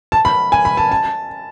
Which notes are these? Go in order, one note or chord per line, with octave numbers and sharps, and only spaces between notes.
A5
B5
G#5
B5
A5
A5